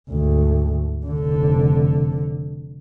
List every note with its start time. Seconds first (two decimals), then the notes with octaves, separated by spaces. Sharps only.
0.10 D2 G#2
1.06 F1 D3